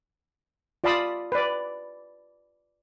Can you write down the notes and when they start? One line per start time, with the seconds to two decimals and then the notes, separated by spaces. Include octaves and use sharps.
0.84 F4 D5 F5 A5 B5 D#6
1.32 B4 D5